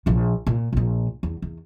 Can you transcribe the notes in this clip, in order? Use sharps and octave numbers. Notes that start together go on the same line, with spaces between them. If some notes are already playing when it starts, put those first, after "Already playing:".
A#1 F3
A#2
A#1 A#2
E2
E2